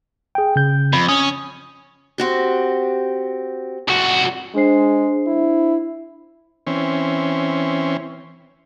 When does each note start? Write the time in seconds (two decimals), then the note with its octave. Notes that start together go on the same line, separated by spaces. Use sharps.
0.35 G#4 G5
0.56 C#3 G6
0.93 F2 B5
1.09 C#4 D#6
2.18 C4 F#4 G4
3.88 C2 F#4
4.55 G#3 D4 C5 C7
5.27 E4
6.67 E3 C4 C#4